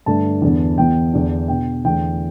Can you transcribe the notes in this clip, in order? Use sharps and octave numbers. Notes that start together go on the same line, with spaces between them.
G2 D3 A3 D4 A5
E2 D3 B3
E2 E3 B3 G5
E2 D3 B3 D4
B2 B3 D4 G5
E2 D3 A3 G5